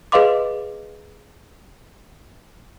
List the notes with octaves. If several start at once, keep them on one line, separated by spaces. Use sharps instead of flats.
G#4 B4 D#5 F5 C6 D6